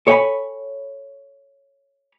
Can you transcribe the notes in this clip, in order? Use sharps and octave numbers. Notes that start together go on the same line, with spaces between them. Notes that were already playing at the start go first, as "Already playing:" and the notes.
A4 C#5 E5 G5 G#5 B5